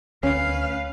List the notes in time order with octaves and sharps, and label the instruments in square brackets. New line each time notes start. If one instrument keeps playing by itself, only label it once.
[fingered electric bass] D2 [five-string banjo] C#4 [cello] B4 F5